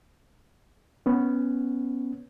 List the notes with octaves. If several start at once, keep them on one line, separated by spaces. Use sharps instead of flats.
B3 C#4